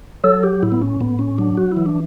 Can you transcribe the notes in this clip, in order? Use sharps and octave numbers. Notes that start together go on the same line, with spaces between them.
F#3 A4
G4
A2 E4
B3
C#4
A2 B3
C#4
F#3 D4
F#4
E3 E4
D4